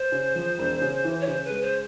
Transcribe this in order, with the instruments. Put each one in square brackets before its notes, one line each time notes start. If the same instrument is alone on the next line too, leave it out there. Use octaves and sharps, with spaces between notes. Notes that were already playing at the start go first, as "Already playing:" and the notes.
Already playing: [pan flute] C5
[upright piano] C#3
F3
E1
C#3
E3
[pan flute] C#5
[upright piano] C#3 [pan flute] C5
[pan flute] B4
[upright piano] G#3
[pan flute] C5